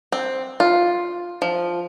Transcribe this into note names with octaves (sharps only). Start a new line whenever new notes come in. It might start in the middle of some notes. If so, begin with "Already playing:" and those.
C4
F4
F3